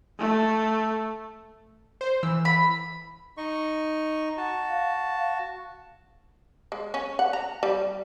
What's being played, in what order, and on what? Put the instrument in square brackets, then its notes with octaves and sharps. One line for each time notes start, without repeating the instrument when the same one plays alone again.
[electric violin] A3
[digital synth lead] C5
[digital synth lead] E3 [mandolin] E6
[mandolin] B5
[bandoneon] D#4 D#5 C#6
F#4 A5
[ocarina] F5
[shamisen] G#3
C#4
F#5
A#5
G3